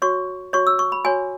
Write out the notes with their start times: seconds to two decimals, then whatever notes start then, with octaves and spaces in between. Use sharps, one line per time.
0.02 F#4 C#5 C#6
0.53 F#4 C#5 C#6
0.67 E6
0.79 C#6
0.92 B5
1.05 F#4 C#5 G#5